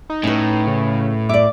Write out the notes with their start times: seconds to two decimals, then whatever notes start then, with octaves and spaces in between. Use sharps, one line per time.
0.10 D#4
0.23 A2 C#4 B4
0.67 C#3
1.29 D5 E5 D6